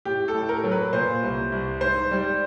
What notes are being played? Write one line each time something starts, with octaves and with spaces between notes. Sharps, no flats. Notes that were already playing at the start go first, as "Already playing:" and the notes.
A2 G4
A4
A2
A#4
F#3
B4
A#2 C5
C2
C2
G#2 C5
G3